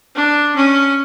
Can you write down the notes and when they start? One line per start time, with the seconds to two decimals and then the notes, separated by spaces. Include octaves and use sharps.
0.15 D4
0.56 C#4